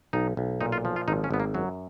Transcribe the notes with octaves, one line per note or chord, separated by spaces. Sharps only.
B1 D#4
B1
A#2 D#4
F4
F3
F4
G#1 D#4
C#4
G#1 B3
A#3
F#2 F#3